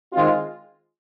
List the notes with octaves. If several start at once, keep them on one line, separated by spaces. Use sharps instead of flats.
D#3 G#3 C4 F4